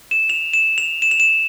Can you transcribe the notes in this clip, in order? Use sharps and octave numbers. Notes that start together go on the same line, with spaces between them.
E7
F7
E7
F7
E7
F7
E7